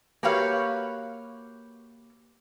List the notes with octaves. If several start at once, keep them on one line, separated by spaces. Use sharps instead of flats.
A#3 F#4 G4 B4 C#5 F5